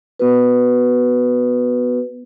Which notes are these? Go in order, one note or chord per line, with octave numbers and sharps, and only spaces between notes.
B3 F#4 B4